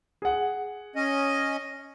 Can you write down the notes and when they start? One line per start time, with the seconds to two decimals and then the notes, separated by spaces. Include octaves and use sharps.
0.22 G#4 F#5
0.96 C#4 D#5